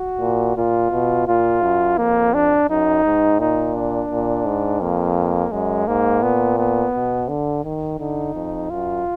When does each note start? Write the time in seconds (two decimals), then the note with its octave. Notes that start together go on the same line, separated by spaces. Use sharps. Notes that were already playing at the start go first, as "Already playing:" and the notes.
Already playing: F#4
0.21 A#2
0.56 A#2 F4
0.91 B2
1.27 A#2 F4
1.63 F#2
1.98 F2 A#3
2.34 D4
2.69 F#2 D#4
3.05 G#2
3.40 A#2 D#4
3.75 D4
4.10 A#2
4.46 G#2
4.81 F2 A#3
5.51 F#2 G#3
5.88 G#2 A#3
6.22 A#2 B3
6.58 B3
6.94 B2
7.28 D3
7.64 D#3
7.99 D3 D#4
8.35 F2
8.70 F#2 F4